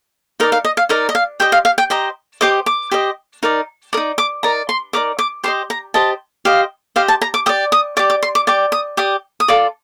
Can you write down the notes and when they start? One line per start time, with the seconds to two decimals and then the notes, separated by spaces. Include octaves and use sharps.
0.40 D#4 A#4 D5 D#5
0.52 F5
0.65 D#5
0.77 F5
0.89 D#4 A#4 D5 D#5
1.09 D#5
1.15 F5
1.40 G4 C5 D#5 G5
1.52 F5
1.65 F5
1.78 G5
1.90 G4 C5 D#5 A#5
2.41 G4 C5 D#5 D6
2.66 D6
2.91 G4 C5 D#5
3.43 D#4 A#4 D5
3.93 A#4 D5 D#6
3.97 D#4
4.18 D6
4.43 D#4 A#4 D5 A#5
4.69 C6
4.93 D#4 A#4 D5 D6
5.19 D6
5.44 G4 C5 D#5 C6
5.70 A#5
5.94 G4 C5 D#5 A5
6.45 G4 C5 D#5 F5
6.96 G4 C5 D#5 F5
7.08 A5
7.22 A#5
7.34 D6
7.46 G4 D#6
7.49 D5
7.72 D#6
7.97 G4 D5 D6
8.10 D6
8.23 C6
8.35 D6
8.47 G4 D5 D6
8.72 D#6
8.97 G4 D5 D#6
9.40 D#6
9.48 F4 A4 D5 D6